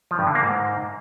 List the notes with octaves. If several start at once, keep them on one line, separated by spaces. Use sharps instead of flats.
F3
G2
D3
A#3
G#2